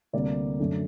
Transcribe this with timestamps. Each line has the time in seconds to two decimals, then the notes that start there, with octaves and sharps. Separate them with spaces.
0.13 D2 C3 G3 A#3 D5
0.59 F#2 D3 A3